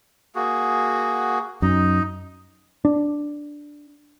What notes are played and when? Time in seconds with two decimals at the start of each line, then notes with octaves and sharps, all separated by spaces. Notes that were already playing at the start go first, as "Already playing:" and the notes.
0.35 A#3 F#4 G#4
1.62 F#2 D#4 D#5
2.85 D4